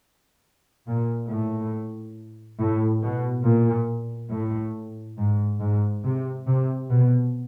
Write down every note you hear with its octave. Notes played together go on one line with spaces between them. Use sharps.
A#2
A2
A2
B2
A#2
A2
G#2
G#2
C3
C3
B2